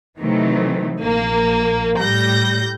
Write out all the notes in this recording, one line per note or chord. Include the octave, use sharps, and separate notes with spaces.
C3 D#3 E3 F#3 A3
A#1 A#3
A2 G3 G6 A#6